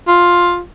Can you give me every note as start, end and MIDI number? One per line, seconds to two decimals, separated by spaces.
0.07 0.61 65